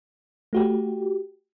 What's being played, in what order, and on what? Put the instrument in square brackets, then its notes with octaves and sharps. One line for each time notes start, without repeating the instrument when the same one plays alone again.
[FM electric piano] A3 F#4 G4